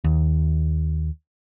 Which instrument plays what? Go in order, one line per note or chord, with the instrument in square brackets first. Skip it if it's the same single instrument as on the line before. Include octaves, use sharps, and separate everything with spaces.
[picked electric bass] D#2